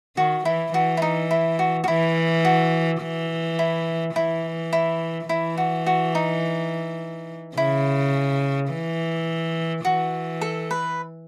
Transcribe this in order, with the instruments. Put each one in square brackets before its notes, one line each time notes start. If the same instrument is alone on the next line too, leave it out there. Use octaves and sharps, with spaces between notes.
[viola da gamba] D#3 [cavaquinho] F#4
[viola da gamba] E3 [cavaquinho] E4
[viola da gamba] E3 [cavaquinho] F#4
[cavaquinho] E4
D#4
E4
F#4
F#4
[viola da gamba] E3 [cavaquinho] E4
[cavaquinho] F#4
[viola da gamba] E3
[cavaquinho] E4
[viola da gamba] E3 [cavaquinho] E4
[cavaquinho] E4
[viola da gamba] E3 [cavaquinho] E4
[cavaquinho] F#4
F#4
D#4
[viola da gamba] C#3 [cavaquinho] E4
[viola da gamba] E3
[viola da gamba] E3 [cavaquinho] F#4
[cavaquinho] A4
B4